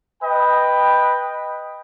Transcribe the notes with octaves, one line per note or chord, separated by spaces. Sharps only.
B4 D#5 G5